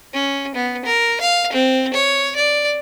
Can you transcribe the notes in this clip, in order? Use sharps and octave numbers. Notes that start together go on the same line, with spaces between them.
C#4
B3
A#4
F5
C4
C#5
D5